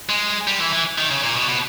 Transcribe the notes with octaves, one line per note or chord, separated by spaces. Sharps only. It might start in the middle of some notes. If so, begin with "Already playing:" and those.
G#3
G3
E3
E3
D#3
C#3
A#2
B2
B2